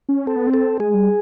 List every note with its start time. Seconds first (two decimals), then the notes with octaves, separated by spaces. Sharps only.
0.09 C#4
0.26 C4 A4
0.36 B3
0.47 C4
0.54 A4
0.80 G#3 G#4
0.94 G3